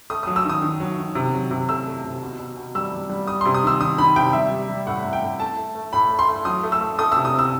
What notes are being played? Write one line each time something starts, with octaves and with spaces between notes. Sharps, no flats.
A3 D#6
F#3 D#6
E6
D#3 D#6
D#3
F#3
D#3
C3
F#3
C3
A3 E6
A3
C3
B2
B2
B2
G3 E6
G3
G3
G3 D#6
C3 C6
D#6
D#3 E6
D#3 D#6
D#3 B5
C3 G5
G3 E5
G3
G3
A2 F#5
A2
G5
A2
A3 A5
A3
A3
A2 B5
A3
C6
A3
F#3 D#6
A3
E6
A3
A3 D#6
C3 E6
D#6
C3 E6